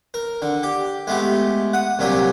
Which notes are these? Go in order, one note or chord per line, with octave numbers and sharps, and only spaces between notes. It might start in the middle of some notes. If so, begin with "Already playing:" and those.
A#4
D3
G4
G#3 A3 B3 G4
F#5 D#6
C2 A#2 F#3 D4 G4 D#6